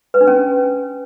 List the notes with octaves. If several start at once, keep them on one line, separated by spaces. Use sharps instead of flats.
B4
D4
C#4